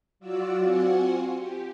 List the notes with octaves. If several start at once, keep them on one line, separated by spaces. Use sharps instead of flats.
F#3 F4 F#4 D5 E6
C4 F4 F#4 F#5 G#5 C6
G4